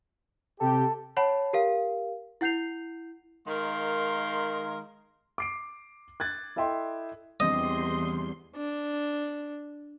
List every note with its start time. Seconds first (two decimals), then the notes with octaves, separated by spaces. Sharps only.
0.60 C3 G4 A4
1.17 C#5 F#5 A5 B5
1.53 G4 A#4 F5
2.41 E4 F#5 G6 C7 F7
3.47 D#3 G#3 A#4 F5 C6
5.38 D6 C7 D7
6.20 F#6 G#6 A6
6.56 E4 A4 D#5 E5 G5 C6
7.40 E2 G3 C4 D4 D#5 C6
8.56 D4